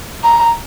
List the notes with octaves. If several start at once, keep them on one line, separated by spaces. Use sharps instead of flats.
A#5